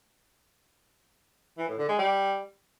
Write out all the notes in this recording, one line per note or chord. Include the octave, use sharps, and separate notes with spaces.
E3
A2
D3
G#3
G3